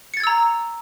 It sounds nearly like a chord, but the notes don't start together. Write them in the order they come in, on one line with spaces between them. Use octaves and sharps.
C#7 A6 G#6 E6 A#5